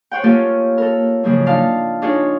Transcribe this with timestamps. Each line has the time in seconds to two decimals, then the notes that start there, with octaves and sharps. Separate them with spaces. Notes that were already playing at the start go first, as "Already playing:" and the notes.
0.11 C5 C#5 F#5 G5
0.24 A#3 C#4 F4 G4 A4
0.78 A4 A#4
1.23 G#2 C#3 F3 F#3 A#3
1.46 D4 D#4 F4 F5 A5
2.02 D4 D#4 F4 G#4 C#5